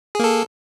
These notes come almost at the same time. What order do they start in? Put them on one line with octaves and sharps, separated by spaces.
G#4 A#3 A4